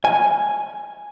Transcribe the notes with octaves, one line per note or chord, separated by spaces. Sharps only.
G#5